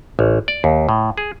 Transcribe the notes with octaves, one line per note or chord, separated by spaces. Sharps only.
A1
D5
D#2
A2
G#4